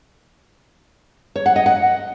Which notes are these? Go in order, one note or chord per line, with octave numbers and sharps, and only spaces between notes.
C#5
F#5
D#5
F#5